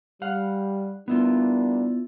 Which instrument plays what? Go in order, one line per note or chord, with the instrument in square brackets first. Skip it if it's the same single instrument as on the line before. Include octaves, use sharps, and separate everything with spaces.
[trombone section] G3 [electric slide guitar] F5 F#5
[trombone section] G3 A#3 D4 [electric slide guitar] B3 E4 F4